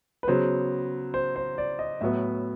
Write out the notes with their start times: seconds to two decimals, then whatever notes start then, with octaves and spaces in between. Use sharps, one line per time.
0.23 B4
0.27 C#3 F#3 B3 C5
1.14 C5
1.36 C5
1.58 D5
1.79 D#5
2.01 A2 F#3 B3 E5